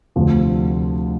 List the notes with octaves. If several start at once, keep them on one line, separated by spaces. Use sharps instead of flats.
D2 C3 F3